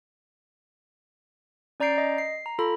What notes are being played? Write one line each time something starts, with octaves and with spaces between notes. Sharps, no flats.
C#4 D5 A#5 G6 C7 D7
D#5
C7
A#5
F4 A4 B5